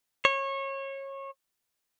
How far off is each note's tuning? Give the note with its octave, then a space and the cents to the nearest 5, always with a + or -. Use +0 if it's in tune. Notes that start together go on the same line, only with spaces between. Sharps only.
C#5 -25